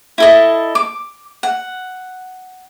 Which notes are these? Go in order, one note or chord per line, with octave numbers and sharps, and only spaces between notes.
E4 A4 D#5
D6
F#5